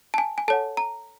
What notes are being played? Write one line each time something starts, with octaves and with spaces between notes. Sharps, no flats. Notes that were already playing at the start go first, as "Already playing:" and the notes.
A5
G#5
G#5
A4 C#5 F#5 A5
A#5